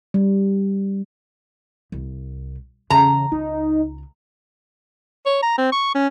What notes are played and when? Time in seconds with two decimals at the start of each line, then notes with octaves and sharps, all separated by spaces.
0.14 G3
1.92 C2
2.90 E2 C#3 A#5
3.32 C#2 D#4
5.26 C#5
5.43 A#5
5.58 C4
5.72 C#6
5.95 C#4